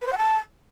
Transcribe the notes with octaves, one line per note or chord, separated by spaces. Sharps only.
B4
C5
F#5
A5